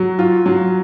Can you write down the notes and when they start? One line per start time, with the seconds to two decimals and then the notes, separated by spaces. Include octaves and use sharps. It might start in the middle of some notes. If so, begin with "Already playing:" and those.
Already playing: F#3
0.19 F4
0.46 F#3